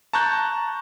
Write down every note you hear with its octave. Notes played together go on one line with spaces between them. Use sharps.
A5 A#5 C#6 F#6 G6